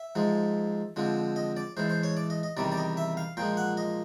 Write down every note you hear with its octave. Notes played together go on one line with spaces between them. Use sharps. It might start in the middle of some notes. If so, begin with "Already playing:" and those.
Already playing: E5
G#2 F3 G#3
F2 D3 F3 G#3
D#5
D5
A2 E3 G#3 C5
C5
C#5
D5
D#5
D#5
E2 C3 D#3 G3 D5
D5
D#5
E5
F5
A#2 F3 G#3 G5
F#5
D#5